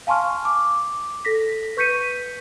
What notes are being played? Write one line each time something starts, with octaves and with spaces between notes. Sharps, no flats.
F5 G#5 A5 C6 C#6 F6
D6
A4 A#6 B6
B4 C#6 G6 B6 C#7 D#7